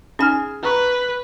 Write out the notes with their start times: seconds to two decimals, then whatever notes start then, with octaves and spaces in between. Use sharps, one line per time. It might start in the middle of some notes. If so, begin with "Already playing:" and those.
0.19 C#4 D#4 G#4 G#5 F6
0.63 B4 A#5 C#6